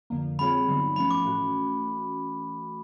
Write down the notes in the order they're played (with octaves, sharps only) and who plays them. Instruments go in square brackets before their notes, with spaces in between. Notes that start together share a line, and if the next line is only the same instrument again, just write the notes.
[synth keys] F2 D3 F3 A#3
[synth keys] G3 C4 F4 G#4 C#5 [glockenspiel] B5
[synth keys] G2 D3 F#3 B3 D#4
[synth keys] F3 A3 C#4 [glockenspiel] B5
[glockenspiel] D6
[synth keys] A2 E3 A3 C#4 F#4